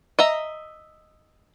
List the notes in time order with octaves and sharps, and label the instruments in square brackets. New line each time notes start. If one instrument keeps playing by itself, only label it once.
[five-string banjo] D#5 E5 A#5